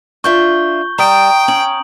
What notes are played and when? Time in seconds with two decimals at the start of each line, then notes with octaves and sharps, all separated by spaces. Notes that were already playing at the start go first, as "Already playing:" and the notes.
0.24 D4 F4 E5 C#6 G6 G7
0.98 G3 G5 A#5 D#6 D7
1.48 C#4 F#7